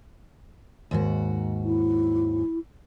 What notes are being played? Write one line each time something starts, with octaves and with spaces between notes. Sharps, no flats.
D#2 G#2 F#4
E4